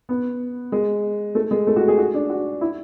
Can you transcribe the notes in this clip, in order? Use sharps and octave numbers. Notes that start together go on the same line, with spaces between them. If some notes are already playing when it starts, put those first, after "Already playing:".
B3
G#3
A3
G#3
A3
F#4
G#4
F#4
D4
F#4
E4